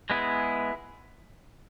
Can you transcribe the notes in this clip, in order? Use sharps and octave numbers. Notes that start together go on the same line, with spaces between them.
G#3 B3 E4 G#4